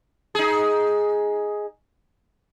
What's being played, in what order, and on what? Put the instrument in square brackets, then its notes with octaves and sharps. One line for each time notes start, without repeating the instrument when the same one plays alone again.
[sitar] D#4 G#4